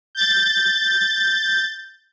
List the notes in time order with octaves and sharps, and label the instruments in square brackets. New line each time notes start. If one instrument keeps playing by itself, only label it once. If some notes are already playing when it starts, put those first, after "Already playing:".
[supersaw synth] G6 A6